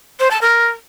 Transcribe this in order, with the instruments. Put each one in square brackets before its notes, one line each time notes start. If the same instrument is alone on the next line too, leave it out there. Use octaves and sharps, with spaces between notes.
[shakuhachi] C5
A5
A#4